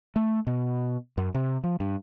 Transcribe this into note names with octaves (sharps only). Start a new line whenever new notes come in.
A3
B2
F#2
C3
F3
G2